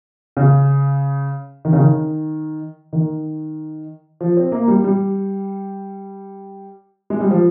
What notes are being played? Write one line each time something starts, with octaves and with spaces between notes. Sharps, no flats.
C#3
D#3
C#3
D#3
D#3
F3
C4
A#3
G3
G3
G#3
G3
F3